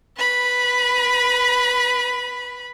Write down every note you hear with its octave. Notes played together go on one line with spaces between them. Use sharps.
B4 B5